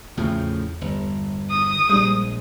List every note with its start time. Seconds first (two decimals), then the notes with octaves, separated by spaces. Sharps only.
0.17 E2 A2 C#3 F3
0.81 G1
1.51 D#6
1.89 A#1 G3 G#3 D4